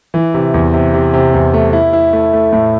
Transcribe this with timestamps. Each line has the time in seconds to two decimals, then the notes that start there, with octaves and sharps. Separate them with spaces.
0.14 E3
0.34 C3
0.54 E2
0.74 C3
0.94 C3
1.14 C3
1.34 E2
1.54 A3
1.73 E4
1.93 E4
2.13 A3
2.33 A3
2.52 A2